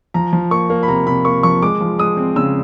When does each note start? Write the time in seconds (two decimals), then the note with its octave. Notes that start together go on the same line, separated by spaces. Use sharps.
0.14 F3 A#5
0.33 F3
0.51 A#3 C#6
0.70 A#3
0.83 B5
0.88 C3 A#5
1.07 C3 B5
1.25 A#3 C#6
1.43 F3 C#6
1.63 G#3 D6
1.81 F3
1.99 G#3 D#6
2.17 C4
2.36 C#3 E6